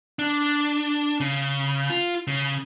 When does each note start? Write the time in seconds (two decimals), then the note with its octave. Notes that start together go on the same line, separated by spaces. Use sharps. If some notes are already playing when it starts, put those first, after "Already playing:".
0.19 D4
1.20 C#3
1.90 F4
2.27 C#3